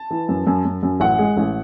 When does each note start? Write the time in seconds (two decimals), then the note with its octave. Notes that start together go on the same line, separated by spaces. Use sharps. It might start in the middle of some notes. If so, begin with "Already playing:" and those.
Already playing: A5
0.11 E3
0.29 F#2
0.47 F#2
0.65 F#2
0.83 F#2
1.00 A1 F#5
1.19 G#3
1.37 A1